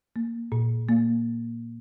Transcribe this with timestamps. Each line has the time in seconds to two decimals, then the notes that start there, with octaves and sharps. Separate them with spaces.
0.16 A#3
0.52 A#2
0.89 A#3